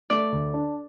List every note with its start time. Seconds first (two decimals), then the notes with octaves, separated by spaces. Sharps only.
0.10 A3 D5
0.32 D2
0.54 D4